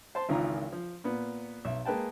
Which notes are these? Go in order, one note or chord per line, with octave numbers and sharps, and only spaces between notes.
C5 A5 C6
G#1 C#2 D#3 E3 F4 A#5
F3
A#2 B3
B1 E5
G#3 A#3 B4 G5 A5